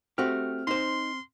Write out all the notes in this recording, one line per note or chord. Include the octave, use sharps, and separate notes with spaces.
A3 C4 F#4 G4 F6
D#4 C5 C6